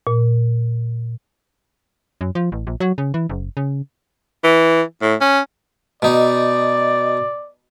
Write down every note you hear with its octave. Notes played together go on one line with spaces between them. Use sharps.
A#2
F#2
F3
A1
A#1
F#3
C#3
E3
F#1
C#3
E3
A2
C#4
B2 D#4 D5